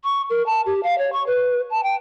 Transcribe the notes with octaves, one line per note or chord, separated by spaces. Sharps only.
C#6
A#4
A5
G4
F5
C#5
C#6
B4
A5
G5